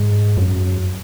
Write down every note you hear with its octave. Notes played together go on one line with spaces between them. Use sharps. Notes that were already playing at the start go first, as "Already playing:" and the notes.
Already playing: G#2
F#2